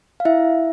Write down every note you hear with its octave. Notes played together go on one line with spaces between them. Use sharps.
F5
E4 E5